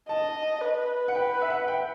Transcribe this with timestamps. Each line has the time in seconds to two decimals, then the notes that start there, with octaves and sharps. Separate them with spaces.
0.09 D#5 A5
0.61 B4
1.08 F#5
1.15 B4 G5
1.42 E5
1.50 F#5
1.68 G5